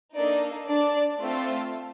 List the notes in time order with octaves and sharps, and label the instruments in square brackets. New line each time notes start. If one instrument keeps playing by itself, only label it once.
[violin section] A#3 D4 D#4 A4 D5
D4 D5
A3 C4 F4 A4